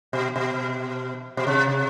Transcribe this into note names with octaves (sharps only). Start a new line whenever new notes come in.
B2
B2
B2
C3